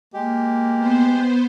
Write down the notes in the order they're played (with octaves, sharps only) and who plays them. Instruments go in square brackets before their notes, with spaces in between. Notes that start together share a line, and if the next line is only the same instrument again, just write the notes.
[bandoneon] G#3 G4 [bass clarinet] A#3
[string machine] B3 C5